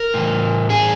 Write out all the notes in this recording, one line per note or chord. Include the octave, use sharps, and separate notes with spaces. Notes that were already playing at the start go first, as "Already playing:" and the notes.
Already playing: A#4
A2 E3
G#4